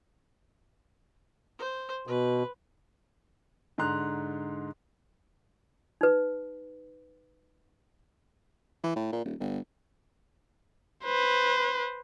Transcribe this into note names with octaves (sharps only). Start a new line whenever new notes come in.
C5
B2 B4
G#2 D3 A#5 C6 F#6 F7
D#4 B4
E3
A2
A#2
D#1
G1
B4 C5